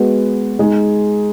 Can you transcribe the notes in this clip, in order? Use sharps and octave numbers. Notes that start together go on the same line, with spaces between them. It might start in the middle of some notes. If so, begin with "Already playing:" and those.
Already playing: G#3 B3 F#4
G#3 D#4 G#4